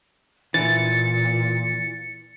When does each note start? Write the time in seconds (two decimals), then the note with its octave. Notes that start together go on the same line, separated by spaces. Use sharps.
0.54 A#2 E3 A6 C#7